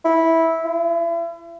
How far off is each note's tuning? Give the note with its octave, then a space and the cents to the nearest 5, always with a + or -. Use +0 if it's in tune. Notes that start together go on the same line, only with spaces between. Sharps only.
E4 -10
E4 +40